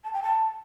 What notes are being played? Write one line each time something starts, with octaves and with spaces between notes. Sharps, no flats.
A5
G5
A5